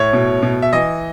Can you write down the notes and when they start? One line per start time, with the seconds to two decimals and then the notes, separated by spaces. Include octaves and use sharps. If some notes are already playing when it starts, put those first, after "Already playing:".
Already playing: A2 C#5
0.13 B2
0.43 B2
0.62 E5
0.73 E3 D#5